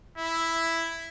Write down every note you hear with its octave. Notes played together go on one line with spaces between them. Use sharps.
E4